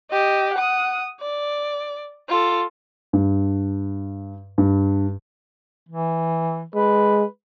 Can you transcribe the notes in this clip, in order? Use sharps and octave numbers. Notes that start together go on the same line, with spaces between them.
G4 D#5
F#5 D#6
D5
F4 A4
G2
G2
E3
G#3 B4